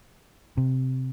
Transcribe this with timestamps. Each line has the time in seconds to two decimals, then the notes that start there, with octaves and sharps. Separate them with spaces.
0.57 C3